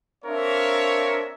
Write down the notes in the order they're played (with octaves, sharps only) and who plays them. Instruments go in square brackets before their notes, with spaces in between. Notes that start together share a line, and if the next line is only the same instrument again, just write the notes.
[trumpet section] C4 D4 A#4 C#5 E5 F5